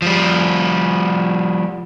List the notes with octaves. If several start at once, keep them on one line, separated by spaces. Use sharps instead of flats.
F3 G3